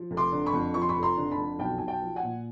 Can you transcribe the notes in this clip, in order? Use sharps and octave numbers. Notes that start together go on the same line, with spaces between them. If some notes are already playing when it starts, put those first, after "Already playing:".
Already playing: F3
F1
C6 D6
D3
B5 C#6
F2
F3 C#6
C6
B5 C#6
F1
A#5 C6
D3
A5 B5
F2
B1 G5 A5
B1 G#5
G5 A5
F3
F#5 G#5
A#2